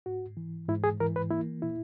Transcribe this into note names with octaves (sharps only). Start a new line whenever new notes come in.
G#2 F#4
E3
G#2 E4
G#4
E3 A#4
B4
A#3 E4
A#2 E4